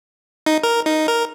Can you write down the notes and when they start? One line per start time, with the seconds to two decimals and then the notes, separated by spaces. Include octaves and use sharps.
0.46 D#4
0.63 A#4
0.86 D#4
1.08 A#4